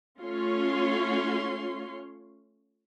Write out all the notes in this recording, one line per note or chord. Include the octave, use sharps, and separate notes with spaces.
A3 C#4 F4 C#5 C6